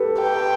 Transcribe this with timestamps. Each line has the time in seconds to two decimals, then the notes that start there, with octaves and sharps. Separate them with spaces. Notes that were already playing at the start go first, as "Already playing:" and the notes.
Already playing: G4 A4 B4
0.22 G5